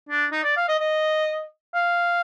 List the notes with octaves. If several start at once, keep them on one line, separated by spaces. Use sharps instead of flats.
D4
D#4
D5
F5
D#5
D#5
F5